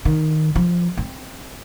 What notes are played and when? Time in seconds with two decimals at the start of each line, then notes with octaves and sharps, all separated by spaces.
0.05 D#3
0.56 F3
0.97 C4